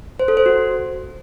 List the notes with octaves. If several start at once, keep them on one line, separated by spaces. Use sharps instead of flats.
C5
A4
C5
F#4